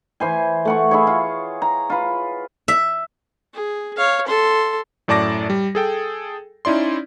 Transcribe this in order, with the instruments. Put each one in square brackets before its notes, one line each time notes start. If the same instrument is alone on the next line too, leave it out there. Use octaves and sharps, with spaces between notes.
[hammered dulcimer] E3 C5 G#5
A3 F#5 C#6
E4 G#4 C#5
F4
A#5
F4 B4
[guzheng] E5
[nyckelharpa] G#4
C#5 F5
A4 C6
[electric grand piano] F#2 A2 D5 A5 D6 A#6
G3
G#4 A4 G5
C#4 D#4 E4 D5 C6